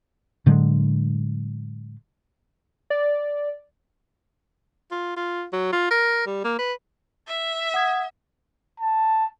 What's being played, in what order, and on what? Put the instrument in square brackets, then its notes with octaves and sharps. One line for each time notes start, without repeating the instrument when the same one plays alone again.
[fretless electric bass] A2 D3 F#3 G#3
[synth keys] D5
[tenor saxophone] F4
F4
F#3
F4
A#4
G3
A#3
B4
[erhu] E5
[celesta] F#5 D#6 G#6
[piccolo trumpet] A5